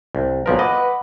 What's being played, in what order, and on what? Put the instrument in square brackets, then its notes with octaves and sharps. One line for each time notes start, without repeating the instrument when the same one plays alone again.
[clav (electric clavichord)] C2
[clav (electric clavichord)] B1 F3 A#4 [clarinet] B4
[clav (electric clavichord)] D#5 [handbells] F#5 B5 D6